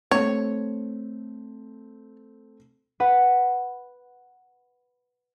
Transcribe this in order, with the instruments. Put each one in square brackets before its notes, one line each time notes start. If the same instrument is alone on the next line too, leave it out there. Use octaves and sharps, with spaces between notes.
[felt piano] A3 C4 [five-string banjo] C#5
[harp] B4 F#5